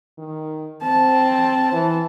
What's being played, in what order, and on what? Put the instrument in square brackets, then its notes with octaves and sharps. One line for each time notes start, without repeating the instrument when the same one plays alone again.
[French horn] D#3
[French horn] C4 [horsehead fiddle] A5
[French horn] E3